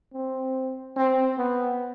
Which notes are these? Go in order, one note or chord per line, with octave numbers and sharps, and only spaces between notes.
C4
C4
B3